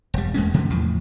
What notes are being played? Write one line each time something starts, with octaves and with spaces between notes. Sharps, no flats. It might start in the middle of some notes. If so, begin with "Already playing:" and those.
E1 G3
E2 G#3 A#3 C#4
B2 D3 F3 A3
E2 A2 F3